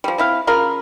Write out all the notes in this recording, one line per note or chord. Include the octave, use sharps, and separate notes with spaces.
F3 G3
C4 E4 F5
C#3 F4 A#4 B5